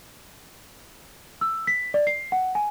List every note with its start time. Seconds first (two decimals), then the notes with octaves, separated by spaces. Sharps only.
1.41 E6
1.67 B6
1.94 D5
2.07 C7
2.32 F#5
2.55 G#5